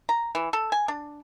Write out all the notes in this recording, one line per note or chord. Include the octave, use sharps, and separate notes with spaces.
A#5
E3
A4
G#5
D4